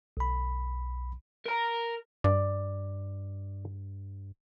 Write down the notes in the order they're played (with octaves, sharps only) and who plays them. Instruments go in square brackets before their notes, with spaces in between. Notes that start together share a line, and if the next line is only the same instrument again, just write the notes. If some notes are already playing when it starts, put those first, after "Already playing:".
[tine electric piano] B1 B5
[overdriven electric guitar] A#4 A#5
[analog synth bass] G2 [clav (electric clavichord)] D5